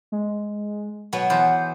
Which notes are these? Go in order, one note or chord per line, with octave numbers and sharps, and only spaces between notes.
G#3
B2 F#3 B3 F#5
E2 B4 C5